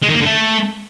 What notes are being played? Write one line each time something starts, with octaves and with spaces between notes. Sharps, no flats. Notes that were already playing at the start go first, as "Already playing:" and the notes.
G#3
D#3
A#3
D3
A3